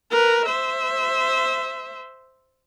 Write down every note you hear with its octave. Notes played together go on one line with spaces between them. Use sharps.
A#4 B4
C5 E5